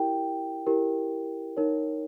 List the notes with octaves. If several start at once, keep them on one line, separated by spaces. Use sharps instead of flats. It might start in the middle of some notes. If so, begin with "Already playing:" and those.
Already playing: E4 G4 A#4 G5
E4 G4 A#4
D#4 A#4 C#5